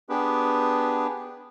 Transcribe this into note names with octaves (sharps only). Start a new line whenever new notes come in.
B3 D4 G4 G#4 B4